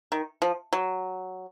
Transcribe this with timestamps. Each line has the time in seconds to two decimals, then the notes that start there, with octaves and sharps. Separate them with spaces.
0.12 D#3
0.42 F3
0.73 F#3